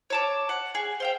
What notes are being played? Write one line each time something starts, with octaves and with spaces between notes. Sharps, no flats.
C#5 A5 D6
F#5
G#4
C5 F5 G5